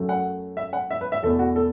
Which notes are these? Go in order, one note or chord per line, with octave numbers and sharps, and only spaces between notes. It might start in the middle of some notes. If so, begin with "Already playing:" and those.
Already playing: F#2 F#3 A3
F#5
E5
F#5
E5
B4
E5
E2 B2 A3 A4
F#4
A4